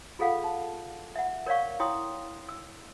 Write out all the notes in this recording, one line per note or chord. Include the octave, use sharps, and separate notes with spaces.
F4 G#4 A4 F5 F#5
A5
E5 F#5
A#4 C#5 D5 F5 C#6
E4 C#5 G5 C6 D#6
E6